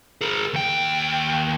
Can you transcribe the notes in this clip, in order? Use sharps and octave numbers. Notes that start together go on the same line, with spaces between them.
G#4 A#4
D#2 G5